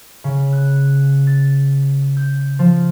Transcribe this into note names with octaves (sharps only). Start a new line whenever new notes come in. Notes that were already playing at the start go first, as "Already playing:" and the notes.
C#3
F#6
A6
G6
F3